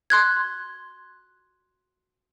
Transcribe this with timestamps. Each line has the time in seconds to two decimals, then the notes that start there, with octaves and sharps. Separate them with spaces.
0.10 C6 F#6 G#6